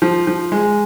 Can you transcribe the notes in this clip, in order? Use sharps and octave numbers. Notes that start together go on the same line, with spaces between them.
F3
F3
G#3